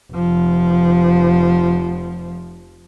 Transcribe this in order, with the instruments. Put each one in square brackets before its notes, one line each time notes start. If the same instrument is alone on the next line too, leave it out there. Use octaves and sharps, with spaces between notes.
[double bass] F1 F3